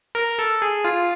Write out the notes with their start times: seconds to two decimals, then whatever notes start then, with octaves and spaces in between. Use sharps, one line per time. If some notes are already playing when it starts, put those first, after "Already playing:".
0.15 A#4
0.39 A4
0.62 G#4
0.85 F4